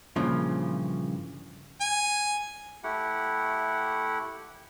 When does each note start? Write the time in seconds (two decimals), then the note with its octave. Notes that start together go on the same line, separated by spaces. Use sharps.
0.16 G2 A#2 C#3 E3 F3
1.81 G#5
2.83 A3 E4 G4 F#5